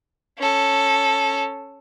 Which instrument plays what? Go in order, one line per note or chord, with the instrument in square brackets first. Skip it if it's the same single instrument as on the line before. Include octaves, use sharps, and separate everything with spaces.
[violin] C#4 A4